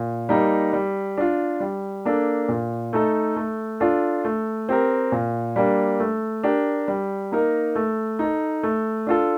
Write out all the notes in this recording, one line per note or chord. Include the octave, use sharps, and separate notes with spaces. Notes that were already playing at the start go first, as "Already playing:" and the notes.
Already playing: A#2
G3 A#3 D#4 A#4
G3
D4 F4
G3
A#3 D4 A4
A#2
A3 D#4 A4
A3
D4 F4 A4
A3
C4 G4 A#4
A#2
G3 A#3 D4
A3
D4 G4 A#4
G3
A#3 D#4 A#4
A3
D#4 A4
A3
D4 F4 A4